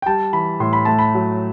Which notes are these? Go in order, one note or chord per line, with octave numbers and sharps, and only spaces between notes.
G5
G3 A5
E3 B5
A2 C6
B5
A3 A5
B5
F#3